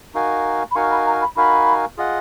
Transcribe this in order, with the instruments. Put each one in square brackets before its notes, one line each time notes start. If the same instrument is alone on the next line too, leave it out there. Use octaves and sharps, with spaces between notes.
[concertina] D#4 F#4 A#4 F5 G#5
[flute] B5
[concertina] D#4 F#4 A#4 F5 G#5 [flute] C#6
[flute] B5
A#5
B5
[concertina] D#4 F#4 A#4 F5 G#5 [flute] B5
[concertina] F4 G#4 D#5 F#5